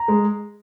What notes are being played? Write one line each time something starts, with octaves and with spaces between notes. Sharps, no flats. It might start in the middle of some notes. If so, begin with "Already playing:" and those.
Already playing: A#5
G#3